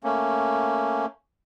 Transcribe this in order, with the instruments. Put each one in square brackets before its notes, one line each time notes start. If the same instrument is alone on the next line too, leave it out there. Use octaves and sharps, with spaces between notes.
[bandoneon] A3 A#3 C#4